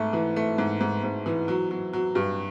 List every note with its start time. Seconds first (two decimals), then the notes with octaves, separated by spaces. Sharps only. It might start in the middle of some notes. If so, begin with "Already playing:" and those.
Already playing: G#2 A3
0.13 E3
0.36 A3
0.58 G#2
0.80 G#2
1.03 G#2
1.26 E3
1.48 F#3
1.71 F#3
1.93 F#3
2.15 G2